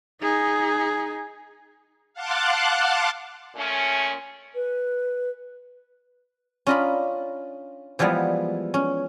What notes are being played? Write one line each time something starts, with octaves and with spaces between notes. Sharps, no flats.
D#4 G#4
F5 F#5 A5 C6 D6 F#6
A#2 A3 C#4
B4
C#4 D4 F4 D#5 A#5 B5
E3 F3 G3 G#3 B3
C#4